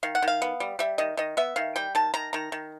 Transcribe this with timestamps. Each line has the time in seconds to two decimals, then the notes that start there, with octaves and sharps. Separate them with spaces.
0.03 D#3 F5
0.15 F#5
0.22 D#3
0.28 F5
0.42 B3
0.60 G3
0.79 G3 E5
0.98 D#3 D#5
1.17 D#3 D#5
1.37 B3 E5
1.56 D#3 F5
1.76 G3 G5
1.95 D#3 A5
2.14 D#3 A#5
2.33 D#3 A#5
2.52 D#3